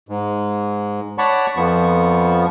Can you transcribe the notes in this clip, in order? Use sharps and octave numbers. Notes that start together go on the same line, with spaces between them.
G#2
C#5 D5 F#5 A5 B5 C#6
F2 F3 B3 C#6